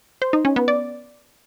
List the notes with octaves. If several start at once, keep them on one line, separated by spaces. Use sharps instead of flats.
C5
D#4
C#4
B3
D5